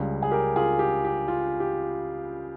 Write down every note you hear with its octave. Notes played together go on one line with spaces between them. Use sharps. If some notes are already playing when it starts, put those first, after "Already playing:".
Already playing: C#2 C#3 G3 C#4
G#4
G4 A#4
F4 G#4
G4
G4
F4
G4